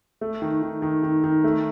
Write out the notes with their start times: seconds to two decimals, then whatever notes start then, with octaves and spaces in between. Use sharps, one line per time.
0.21 A3
0.42 D#3
0.62 D#3
0.82 D#3
1.03 D#3
1.24 D#3
1.44 A3